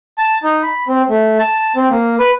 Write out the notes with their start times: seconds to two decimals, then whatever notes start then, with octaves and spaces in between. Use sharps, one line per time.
0.18 A5
0.43 D#4
0.63 B5
0.88 C4
1.09 A3
1.39 A5
1.76 C4
1.90 A#3
2.19 B4